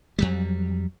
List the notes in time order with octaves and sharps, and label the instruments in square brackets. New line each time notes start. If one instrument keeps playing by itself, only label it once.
[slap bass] F2 F#3 G3